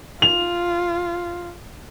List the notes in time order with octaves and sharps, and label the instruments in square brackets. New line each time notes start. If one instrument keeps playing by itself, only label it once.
[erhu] F4 [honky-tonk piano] F7